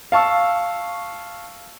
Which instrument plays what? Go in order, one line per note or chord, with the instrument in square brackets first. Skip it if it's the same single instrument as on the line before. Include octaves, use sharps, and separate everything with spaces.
[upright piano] F5 A5 C#6 E6